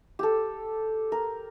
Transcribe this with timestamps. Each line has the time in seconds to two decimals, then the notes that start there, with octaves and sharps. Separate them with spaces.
0.19 G4 A4
1.12 A#4